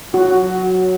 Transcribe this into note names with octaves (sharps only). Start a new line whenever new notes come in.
F#3 F#4